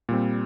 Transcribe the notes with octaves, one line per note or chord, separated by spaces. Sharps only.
A#2 G3 C4